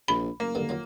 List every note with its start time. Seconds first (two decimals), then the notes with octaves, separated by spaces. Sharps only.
0.08 A#1 C3 B5
0.40 F#1 A#3
0.55 G2 D3 D#3
0.69 D#3 F#3 F4